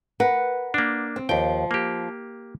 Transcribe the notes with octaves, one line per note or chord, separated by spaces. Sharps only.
A#4 B4 F#5
A#3 D4
C4
D#2 F3 G5
A#3 G4